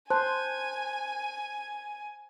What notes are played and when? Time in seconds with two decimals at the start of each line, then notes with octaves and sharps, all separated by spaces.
0.10 C5 G#5 A5 F#6